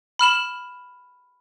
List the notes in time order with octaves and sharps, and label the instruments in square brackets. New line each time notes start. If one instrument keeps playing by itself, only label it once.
[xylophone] B5 F6 E7 F#7